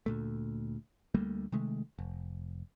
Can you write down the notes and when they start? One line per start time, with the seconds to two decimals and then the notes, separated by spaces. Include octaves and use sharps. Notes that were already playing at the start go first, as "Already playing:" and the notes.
0.06 D2 A#2 A3
1.14 D2 G3 A3 A#3
1.52 C3 D#3 G#3 A3
1.99 F1